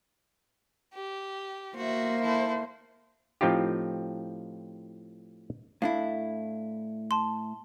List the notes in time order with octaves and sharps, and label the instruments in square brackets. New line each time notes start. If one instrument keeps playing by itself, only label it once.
[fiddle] G4
[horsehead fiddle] A#3 C5 [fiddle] F#4 E5
[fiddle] E4 A4
[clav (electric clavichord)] A2 F3 C4 D#4 F4 G4
[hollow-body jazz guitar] A2 D4 E4 [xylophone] F5
[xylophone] A5 C6